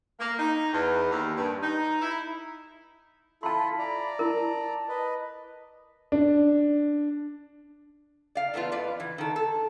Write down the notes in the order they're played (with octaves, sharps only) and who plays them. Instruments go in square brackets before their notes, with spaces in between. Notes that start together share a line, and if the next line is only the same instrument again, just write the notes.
[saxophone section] A#3
D#4
E2
D#2
G2
D#4
E4
[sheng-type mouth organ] E4 F4 A4 [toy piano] A5 C6 [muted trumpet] B5
[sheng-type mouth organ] D5 A#5
[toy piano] E4 A#4 [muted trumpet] A5
[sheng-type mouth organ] B4 D#5
[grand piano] D4
[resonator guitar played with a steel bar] D5 F5
E3 A3 B3 F4
F2 B4 D5
E3
D#3 A4
A4